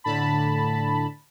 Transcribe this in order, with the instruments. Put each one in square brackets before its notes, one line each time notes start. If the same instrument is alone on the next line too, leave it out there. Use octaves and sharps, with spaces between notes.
[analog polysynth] A2 D3 A5 B5